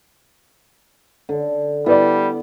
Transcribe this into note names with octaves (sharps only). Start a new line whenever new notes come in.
D3
G3 B3 E4 B4 D5